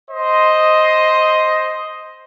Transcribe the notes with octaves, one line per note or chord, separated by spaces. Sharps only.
C5 D#5